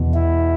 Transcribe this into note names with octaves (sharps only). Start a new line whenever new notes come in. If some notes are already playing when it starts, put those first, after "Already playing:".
Already playing: E2 B2
E4